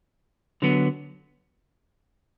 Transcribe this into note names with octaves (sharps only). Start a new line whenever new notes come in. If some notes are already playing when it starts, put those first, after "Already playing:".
D3 F#3 B3